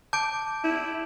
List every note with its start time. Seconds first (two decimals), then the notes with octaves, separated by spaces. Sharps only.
0.13 A5 D6 G6 D7
0.64 E4